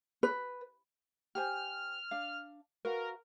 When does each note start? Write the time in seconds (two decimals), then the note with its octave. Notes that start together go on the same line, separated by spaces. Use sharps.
0.23 B4
1.35 G4 C5 G#5 F6
2.11 D4 F5
2.85 F#4 A#4 B4 F5